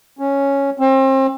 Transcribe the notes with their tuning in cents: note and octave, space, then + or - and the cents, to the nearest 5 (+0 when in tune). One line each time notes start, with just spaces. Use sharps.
C#4 +0
C4 +35